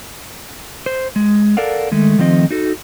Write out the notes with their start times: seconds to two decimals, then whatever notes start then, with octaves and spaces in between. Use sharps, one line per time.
0.86 C5
1.16 G#3
1.57 A4 A#4 D5 F5 F#5
1.91 D#3 G#3 A3
2.19 D#3 F3 A3 C4 D#5
2.51 D#4 F#4 A4